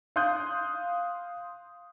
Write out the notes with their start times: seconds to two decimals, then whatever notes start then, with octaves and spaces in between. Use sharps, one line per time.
0.16 F5 C6 D#6 F#6 G6